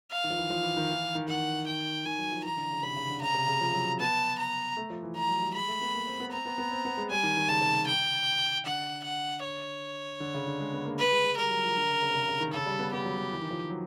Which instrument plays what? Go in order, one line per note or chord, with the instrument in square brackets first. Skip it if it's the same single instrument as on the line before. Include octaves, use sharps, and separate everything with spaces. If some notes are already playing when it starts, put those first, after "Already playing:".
[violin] F5
[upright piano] D#3
F3
E3
F3
E3
D#3
E3
D#3
[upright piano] D#3 [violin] F#5
[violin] G5
[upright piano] D#3 [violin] G#5
[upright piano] F#3
F3
[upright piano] E3 [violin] A#5
[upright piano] D3
C#3
[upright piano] C3 [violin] B5
[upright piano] C#3
D3
[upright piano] C#3 [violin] A#5
[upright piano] C3
C#3
F3
F#3
[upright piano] B3 [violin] A5
[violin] A#5
[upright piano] A3
F3
E3
[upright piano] F3 [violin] A#5
[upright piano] F#3
G3
[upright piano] G#3 [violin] B5
[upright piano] A3
B3
A#3
C4
B3
[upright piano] C4 [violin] A#5
[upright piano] B3
B3
C4
B3
G#3
[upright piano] G3 [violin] G#5
[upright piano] D#3
D#3
[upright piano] C#3 [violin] A5
[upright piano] C3
[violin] G5
[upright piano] D3 [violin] F#5
[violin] F#5
C#5
[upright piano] D3
C#3
D3
G#3
B3
A#3
[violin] B4
[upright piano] G#3
G#3
[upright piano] G3 [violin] A#4
[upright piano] F#3
F3
D3
C#3
C#3
C3
C#3
C#3
D#3
[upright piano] C#3 [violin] A4
[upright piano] G3
B3
[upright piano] B3 [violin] G4
[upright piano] F#3
F#3
E3
D#3
F3
F#3